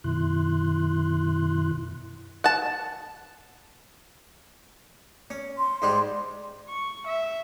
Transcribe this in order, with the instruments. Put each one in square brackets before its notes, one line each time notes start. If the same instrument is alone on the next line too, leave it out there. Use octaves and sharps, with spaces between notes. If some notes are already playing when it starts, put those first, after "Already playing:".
[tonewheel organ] F#2 B2 D#3 E4 C6 F#6
[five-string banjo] F#5 A5
[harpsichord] C#4
[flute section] C6
[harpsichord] G#2 G3 G#3
[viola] C#6
E5